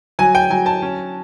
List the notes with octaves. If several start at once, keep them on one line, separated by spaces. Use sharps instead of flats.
F#3 G#5
G5
F#3 G#5
A5
C#4